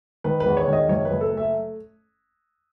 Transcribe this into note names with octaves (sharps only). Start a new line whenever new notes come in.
D#3 B4
B4
E2
C#5
D#3
D#5
F#1 C#5
F#1 B4
A4
A3
E5